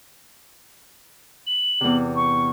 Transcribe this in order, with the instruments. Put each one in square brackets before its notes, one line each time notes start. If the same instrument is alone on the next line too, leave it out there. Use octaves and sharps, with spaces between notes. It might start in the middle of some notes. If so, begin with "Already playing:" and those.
[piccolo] F#7
[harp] E2 C3
[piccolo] C#6